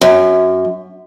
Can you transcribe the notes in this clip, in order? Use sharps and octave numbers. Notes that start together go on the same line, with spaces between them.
F#2